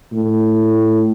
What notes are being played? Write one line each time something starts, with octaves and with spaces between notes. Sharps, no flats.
A2